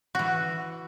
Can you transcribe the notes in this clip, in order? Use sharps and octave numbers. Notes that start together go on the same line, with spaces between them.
E3 F#4